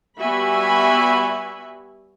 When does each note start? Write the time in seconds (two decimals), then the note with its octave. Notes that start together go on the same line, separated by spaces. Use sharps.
0.19 G3 B3 F#4 E5 G#5 B5